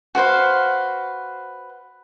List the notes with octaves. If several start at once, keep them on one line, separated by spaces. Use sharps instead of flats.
F#4 B4 C5 F5